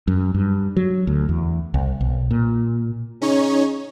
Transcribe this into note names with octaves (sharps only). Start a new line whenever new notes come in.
F#2
G2
F#3
D2
E2
C2
B1
A#2
C#3 C#4 D#4 C#5